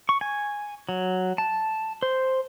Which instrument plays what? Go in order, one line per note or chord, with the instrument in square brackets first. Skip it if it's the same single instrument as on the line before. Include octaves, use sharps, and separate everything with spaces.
[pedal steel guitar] C#6
G#5
F#3
A5
C5